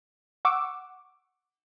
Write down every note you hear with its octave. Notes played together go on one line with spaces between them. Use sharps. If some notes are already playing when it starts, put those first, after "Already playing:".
F#5 C#6 D6 E6